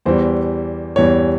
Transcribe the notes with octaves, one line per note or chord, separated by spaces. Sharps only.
E2 E3 G3 C5
E2 E3 G3 C#5